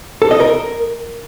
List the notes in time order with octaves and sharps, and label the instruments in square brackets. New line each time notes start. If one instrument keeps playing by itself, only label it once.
[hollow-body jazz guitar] A4
D#5
A#4